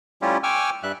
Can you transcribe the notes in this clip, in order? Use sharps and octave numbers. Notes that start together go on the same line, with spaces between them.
G3 A3 C#4 E4 F4 G4
G5 G#5 C#6 D6 E6 F6
G2 G3 E5 F#6